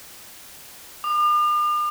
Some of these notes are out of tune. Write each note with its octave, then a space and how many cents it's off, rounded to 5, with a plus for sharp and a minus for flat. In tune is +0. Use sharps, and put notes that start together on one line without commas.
D6 +45